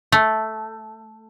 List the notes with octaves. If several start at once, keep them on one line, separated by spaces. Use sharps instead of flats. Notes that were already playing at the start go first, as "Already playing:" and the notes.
A3